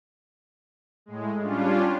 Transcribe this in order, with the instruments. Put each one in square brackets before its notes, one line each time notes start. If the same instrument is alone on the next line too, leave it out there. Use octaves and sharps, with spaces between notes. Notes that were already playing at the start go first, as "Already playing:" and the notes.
[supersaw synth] A2 G#3
G3 C#4 D4 F4